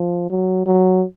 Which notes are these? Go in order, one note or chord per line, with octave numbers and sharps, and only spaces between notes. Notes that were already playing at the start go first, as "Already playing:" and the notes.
Already playing: F3
F#3
F#3